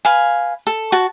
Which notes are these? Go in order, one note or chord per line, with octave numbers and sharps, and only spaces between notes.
B4 F5 G#5
A4
F#4 A5